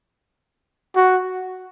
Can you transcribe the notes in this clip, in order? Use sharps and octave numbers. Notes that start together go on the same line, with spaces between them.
F#4